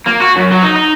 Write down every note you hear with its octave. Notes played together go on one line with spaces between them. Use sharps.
A#3
F#4
F#2
F#3
D#4
D#4